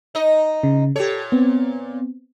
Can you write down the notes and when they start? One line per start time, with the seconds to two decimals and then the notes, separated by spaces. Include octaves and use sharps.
0.15 D#4 D#5
0.63 C#3
0.96 A#2 G4 A4 C#5
1.32 B3 C4